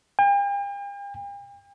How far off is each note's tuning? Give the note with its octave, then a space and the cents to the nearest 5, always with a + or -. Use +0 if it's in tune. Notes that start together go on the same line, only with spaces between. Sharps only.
G5 +45